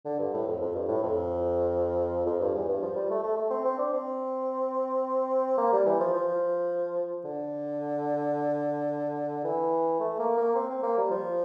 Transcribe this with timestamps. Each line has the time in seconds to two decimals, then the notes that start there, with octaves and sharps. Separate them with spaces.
0.05 D3
0.19 G2
0.34 A2
0.48 F2
0.62 F2
0.75 G2
0.88 A2
1.03 F2
2.26 F2
2.41 G2
2.55 E2
2.68 G2
2.82 F3
2.96 G3
3.10 A3
3.23 A3
3.37 A3
3.50 C4
3.65 C4
3.78 D4
3.93 C4
5.58 A#3
5.73 G3
5.86 E3
6.00 F3
6.13 F3
7.25 D3
9.44 E3
10.00 A3
10.19 A#3
10.38 A#3
10.55 C4
10.70 C4
10.83 A#3
10.97 G3
11.11 F3